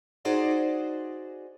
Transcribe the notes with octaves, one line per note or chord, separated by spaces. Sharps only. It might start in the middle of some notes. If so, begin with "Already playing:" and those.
D#4 F#4 G#4 C5 D5 D#5